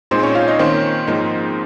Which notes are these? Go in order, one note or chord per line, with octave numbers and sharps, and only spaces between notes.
A#2 G#3 C4 D#4 C5
C#4 C#5
F4 F5
D#4 D#5
D#3 A#3 C4 C#4 C5
G#2 F3 A#3 D#4